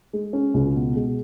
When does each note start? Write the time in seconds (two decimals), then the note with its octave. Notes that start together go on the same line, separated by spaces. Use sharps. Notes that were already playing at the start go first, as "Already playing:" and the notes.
0.13 G#3
0.33 C#4
0.54 C#2
0.75 B2
0.96 G#3